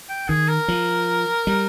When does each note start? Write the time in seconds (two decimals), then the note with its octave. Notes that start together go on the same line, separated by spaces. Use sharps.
0.09 G5
0.29 D#3 G#4
0.48 A#4
0.68 F3
1.47 G3